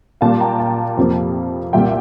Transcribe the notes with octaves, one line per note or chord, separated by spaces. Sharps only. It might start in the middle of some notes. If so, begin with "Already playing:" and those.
A#2 G3 A#3 F5 A5
G5 A#5
F5 A5
F2 C3 F3 A#3
C2 A#2 G3 A#3 E5 G5